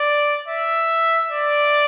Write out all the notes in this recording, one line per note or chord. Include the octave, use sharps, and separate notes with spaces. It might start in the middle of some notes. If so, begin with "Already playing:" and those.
Already playing: D5
E5
D5